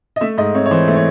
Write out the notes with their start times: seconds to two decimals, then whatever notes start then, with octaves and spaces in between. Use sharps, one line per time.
0.16 D#5
0.21 A3 E5
0.38 G#2 D#5
0.54 C4 C#5
0.66 C#5
0.71 E3 C5
0.88 A3
0.96 C#5